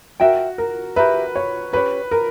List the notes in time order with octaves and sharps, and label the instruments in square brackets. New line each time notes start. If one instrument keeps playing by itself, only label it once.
[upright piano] F#4 [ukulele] A#4 E5 G5
[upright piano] A#4
[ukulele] G4 A#4 E5 [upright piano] B4
[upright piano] C#5
[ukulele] C#4 G4 C#5 [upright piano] B4
[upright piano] A#4